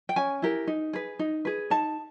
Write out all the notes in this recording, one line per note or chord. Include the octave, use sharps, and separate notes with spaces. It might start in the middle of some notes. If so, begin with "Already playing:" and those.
G5
C#4 G#5
E4 G4 A#4
D#4
G#4 B4
D#4
G#4 B4
D#4 A5